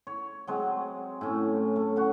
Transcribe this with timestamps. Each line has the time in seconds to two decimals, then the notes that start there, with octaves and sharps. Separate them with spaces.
0.07 C#5
0.47 F#3 G#3 C4
1.21 A2 C#4
1.76 A3
1.96 C#4 F#4